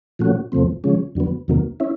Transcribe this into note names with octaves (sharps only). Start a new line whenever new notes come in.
A#2 F3 A3 C#4 F#4
E2 C3 F3 A3 C4
C#3 F3 G#3 C#4
F2 D3 F#3 B3
E2 C3 D#3 F#3 A#3
C#4 E4